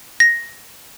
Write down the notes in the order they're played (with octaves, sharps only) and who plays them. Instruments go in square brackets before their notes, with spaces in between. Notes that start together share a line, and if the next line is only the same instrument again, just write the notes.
[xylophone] A#6